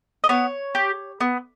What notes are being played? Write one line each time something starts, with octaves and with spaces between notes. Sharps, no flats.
D#5
B3 C#5
G4
B3